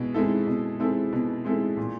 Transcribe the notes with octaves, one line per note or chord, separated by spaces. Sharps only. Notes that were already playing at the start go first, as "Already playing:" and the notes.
Already playing: B2 G#3 E4
G#3 C4 E4 A4
B2
G#3 C4 E4 A4
B2
G#3 C4 E4 A4
A#2